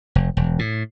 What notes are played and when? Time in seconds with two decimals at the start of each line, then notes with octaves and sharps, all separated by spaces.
0.15 F1
0.37 E1
0.59 A2